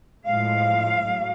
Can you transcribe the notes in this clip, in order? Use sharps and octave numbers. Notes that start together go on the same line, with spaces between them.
A2 F3 G#3 F5
A2 F#3